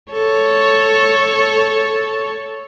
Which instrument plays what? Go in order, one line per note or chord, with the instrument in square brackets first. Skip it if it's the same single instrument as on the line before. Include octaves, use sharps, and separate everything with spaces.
[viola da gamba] A4 C#5